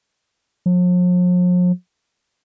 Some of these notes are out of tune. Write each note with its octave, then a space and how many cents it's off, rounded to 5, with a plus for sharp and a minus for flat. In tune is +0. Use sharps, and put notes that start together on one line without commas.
F3 +45